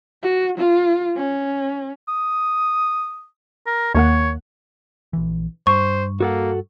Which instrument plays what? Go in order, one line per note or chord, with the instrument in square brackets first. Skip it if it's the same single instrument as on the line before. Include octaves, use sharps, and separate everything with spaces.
[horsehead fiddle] F#4
F4
C#4
[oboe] D#6
A#4
[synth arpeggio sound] D#2 A#3 F#5 [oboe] C#5
[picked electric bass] A#1 E3
[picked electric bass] G2 [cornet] C5 [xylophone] C#6
[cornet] A#3 [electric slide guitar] F#4 A4 F#5